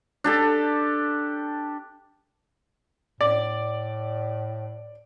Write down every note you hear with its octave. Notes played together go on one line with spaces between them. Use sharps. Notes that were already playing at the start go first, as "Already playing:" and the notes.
D4 G4 A4
A2 D5